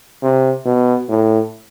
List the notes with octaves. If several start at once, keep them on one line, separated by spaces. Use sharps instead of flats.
C3
B2
A2